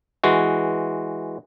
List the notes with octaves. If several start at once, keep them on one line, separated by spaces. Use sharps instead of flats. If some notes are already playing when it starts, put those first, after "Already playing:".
E3 G#3 F#4